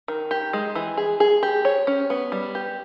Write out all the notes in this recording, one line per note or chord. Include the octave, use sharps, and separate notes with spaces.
D#3
G4
G#3
E3
G#4
G#4
G4
C#5
C#4
B3
G3
G4